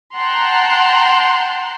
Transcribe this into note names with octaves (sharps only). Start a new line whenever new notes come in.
F#5 G5 A5 A#5 C6 F#6